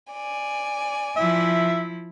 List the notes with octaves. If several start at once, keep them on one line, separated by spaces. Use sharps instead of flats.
D5 G#5
F3 E4 E5